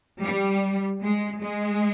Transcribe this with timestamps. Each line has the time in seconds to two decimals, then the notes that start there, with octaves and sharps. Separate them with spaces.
0.23 G3
1.03 G#3
1.42 G#3